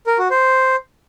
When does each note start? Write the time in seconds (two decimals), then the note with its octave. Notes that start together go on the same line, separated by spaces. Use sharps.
0.07 A#4
0.19 F#4
0.31 C5